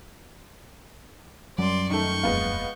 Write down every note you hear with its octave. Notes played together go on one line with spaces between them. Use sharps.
F#2 F#3 G3 D5 C6
D#3 A3 C#6 G6
D#1 F2 G#3 A#3 B3 F4